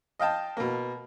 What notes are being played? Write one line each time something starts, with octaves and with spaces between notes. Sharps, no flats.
D#5 F5 G5 A5
B2 A#3